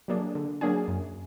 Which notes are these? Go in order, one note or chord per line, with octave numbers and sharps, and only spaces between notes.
F#3 A#3 D4 G#4
D3
F#3 A#3 D4 G#4
F#2